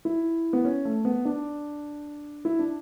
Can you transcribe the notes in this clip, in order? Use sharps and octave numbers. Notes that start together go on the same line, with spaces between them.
E4
B3
C#4
A3
B3
D4
E4
D4